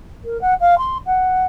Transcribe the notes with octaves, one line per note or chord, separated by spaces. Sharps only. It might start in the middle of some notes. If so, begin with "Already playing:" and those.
A#4
F#5
F5
C6
F#5